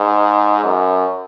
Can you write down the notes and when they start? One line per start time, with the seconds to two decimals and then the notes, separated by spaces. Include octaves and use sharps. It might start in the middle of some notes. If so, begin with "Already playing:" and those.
Already playing: G#2
0.64 F#2